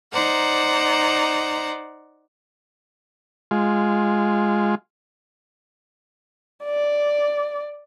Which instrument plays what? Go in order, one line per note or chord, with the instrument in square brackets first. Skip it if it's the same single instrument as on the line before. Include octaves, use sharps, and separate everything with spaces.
[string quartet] D#4 C5 D5 F#5 A#5
[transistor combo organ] G#3 F4
[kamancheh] D5